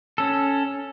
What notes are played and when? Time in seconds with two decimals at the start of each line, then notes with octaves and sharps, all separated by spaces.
0.18 C#4 A4